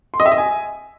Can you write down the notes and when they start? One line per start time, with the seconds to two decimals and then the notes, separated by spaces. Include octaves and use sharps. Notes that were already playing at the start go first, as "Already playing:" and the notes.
0.14 C6
0.20 D#5
0.26 E5
0.32 D#5
0.38 G#5